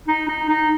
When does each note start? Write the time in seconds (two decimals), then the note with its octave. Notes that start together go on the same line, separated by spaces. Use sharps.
0.08 D#4
0.29 D#4
0.49 D#4